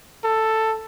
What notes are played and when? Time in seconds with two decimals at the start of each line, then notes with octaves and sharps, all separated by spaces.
0.24 A4